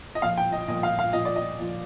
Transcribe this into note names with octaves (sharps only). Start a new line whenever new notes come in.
D#5
A#2 F3 F5
G5
D#5
A#2 F3 D#5
F5
F5
A#2 F3 D#5
D5
D#5
A#2 F3